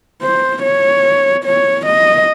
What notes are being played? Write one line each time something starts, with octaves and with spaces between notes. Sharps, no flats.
C5
C#5
C#5
D#5